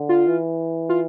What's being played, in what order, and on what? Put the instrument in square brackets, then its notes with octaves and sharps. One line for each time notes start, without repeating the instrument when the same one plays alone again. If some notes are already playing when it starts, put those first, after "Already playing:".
Already playing: [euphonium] D3
[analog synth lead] F4
[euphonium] E3
[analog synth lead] F4